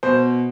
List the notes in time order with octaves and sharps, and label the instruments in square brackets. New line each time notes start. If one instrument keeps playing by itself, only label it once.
[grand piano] B2 C5